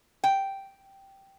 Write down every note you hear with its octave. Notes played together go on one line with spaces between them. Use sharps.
G5